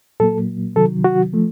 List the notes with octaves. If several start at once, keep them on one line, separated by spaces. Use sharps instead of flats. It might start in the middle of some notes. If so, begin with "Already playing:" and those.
A#2 F#3 A#3 A4
C3 D#3 F#3 A4
F#4
F3 A3